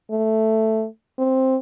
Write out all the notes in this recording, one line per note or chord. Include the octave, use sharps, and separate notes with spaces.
A3
C4